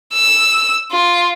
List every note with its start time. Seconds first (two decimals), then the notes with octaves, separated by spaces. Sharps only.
0.14 E6
0.92 F4